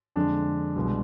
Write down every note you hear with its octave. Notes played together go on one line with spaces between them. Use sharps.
F2 D3 G#3 D4
C2 B2 G#3